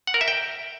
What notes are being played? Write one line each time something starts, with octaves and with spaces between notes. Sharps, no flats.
F#5
A#4
E5
G5